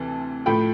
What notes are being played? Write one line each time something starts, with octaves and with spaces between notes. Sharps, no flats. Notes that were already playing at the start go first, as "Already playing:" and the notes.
Already playing: D2 C3 E3 A5
A2 F3 A3 G5 B5